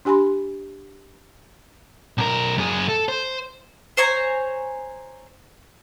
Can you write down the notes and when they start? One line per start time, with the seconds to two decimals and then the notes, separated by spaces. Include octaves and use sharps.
0.05 D4 G4 G#5 B5 C6
2.18 B1 A#4
2.58 F#2 G#4
2.89 A4
3.09 C5
3.97 C5 C#5 G#5 A#5